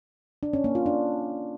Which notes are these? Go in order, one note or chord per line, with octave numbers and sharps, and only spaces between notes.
D4
C#4
A#3
F4
D4